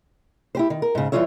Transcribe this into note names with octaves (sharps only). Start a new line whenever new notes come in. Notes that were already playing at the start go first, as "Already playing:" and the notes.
E4 G4 C5
D#3
A#4
G#2 C#3
E3 F#3 G3 F4 C#5 E5